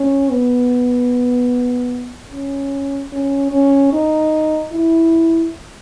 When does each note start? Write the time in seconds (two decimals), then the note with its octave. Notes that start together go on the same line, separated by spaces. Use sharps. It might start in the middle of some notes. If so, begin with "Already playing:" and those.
Already playing: C#4
0.30 B3
2.32 C#4
3.13 C#4
3.52 C#4
3.93 D#4
4.72 E4